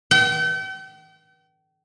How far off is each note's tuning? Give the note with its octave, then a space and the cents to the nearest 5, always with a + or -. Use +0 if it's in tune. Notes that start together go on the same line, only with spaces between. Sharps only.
G5 -40